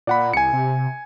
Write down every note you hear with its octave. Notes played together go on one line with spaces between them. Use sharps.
A#2 D5 F#5 B5
C2 G#5 C#7
C3